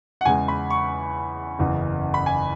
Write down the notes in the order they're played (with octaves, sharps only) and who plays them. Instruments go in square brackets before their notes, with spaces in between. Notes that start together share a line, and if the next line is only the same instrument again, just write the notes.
[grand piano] F#5
E2 C#3 G#3 G#5
B5
C#6
F#1 E2 C#3 E3
B5
G#5